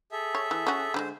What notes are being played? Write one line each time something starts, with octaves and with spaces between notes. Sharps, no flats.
G#4 A4 E5
C#5
E3
C#4 F#4
D3 G3 G#3 C5